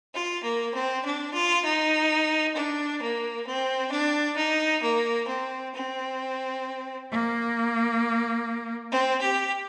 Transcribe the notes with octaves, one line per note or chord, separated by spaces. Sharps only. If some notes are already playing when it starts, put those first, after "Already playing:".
F4
A#3
C4
D4
F4
D#4
D4
A#3
C4
D4
D#4
A#3
C4
C4
A#3
C4
G4